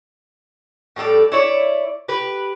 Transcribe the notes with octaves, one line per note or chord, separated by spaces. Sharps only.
A2 G3 A4 D5
E4 C#5 D5
G4 B4